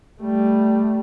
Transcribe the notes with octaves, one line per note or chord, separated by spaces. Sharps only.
G3 A3